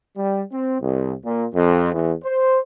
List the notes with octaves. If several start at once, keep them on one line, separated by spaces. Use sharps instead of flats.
G3
C4
C2
A#2
F2
E2
C5